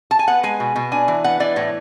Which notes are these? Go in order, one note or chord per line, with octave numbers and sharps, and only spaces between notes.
A5
G#5
B3 F#5
G#3 G#5
B2
B2
D4 G#5
E3
B3 F#5
E3 D5
A2 C#5